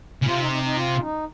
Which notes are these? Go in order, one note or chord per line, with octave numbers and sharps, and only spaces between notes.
C#3
C3 F4
D#4
D#4
D#4
F4
D#4